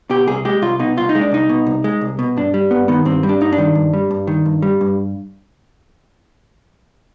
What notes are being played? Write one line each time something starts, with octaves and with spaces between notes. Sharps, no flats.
B2 G4
C2 G#4
G#3 G4
C2 F4
B2 D#4
C2 F4
D#4
G#3
D4
C2 D#4
B2
C2
G#3
C2
B2
G2 D4
G3
G2 B3
D#3 B3
G2 C4
G3
D4
G2 D#4
D4
D#3
G2
G3
G2
D#3
G2
G3
G2